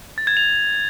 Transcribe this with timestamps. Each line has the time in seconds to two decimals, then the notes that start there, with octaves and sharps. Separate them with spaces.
0.18 A6
0.27 G#6
0.37 F7